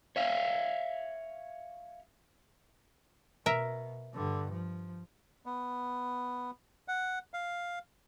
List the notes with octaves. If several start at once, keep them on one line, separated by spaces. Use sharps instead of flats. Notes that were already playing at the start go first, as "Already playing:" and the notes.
C#5 E5 F5
B2 A#4 E5
G2 D3
F3
B3
F#5
F5